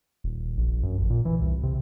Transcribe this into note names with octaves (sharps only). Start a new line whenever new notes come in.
D#1
A#1
F#2
A1
A#2
E3
C2
C3